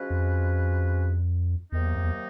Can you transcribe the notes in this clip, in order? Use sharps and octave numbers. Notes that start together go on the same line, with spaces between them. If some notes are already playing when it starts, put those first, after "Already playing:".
Already playing: F3 G#3 C#4 F#4 B4
F2
E2 C3 D#3 F#3 A#3 D#4
F2
E2